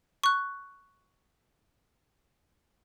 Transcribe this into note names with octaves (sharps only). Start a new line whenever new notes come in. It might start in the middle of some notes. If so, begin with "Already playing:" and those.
C#6 F#6